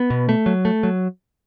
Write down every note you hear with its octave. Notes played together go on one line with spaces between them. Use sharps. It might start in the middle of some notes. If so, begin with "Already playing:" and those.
Already playing: B3
B2
A3
F#3
A3
F#3